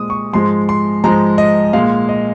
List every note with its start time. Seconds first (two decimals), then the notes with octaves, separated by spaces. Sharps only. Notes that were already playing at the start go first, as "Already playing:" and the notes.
Already playing: A#2 G#3 D#6
0.10 C#6
0.33 G#2 F3 G#3 C6
0.69 C6
1.04 G#2 F3 G#3 A#5
1.38 D#5
1.73 A#2 G#3 F5
2.09 D#5